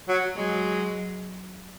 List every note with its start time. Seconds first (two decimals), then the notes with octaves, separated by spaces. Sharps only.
0.09 F#3
0.36 F#3 G#3